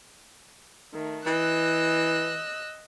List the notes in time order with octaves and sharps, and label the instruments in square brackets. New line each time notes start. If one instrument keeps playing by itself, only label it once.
[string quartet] D#3 A3
[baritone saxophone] E3 [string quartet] D#5 E6 F#6